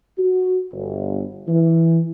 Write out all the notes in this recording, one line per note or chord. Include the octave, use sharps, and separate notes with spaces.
F#4
G1
E3